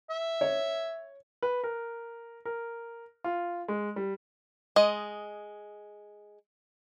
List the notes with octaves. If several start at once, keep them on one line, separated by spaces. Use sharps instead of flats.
E5
C#5
B4
A#4
A#4
F4
G#3
G3
G#3 D#5